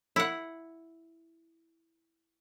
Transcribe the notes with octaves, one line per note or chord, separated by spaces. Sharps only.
E4 F#5